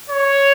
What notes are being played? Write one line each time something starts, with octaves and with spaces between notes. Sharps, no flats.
C#5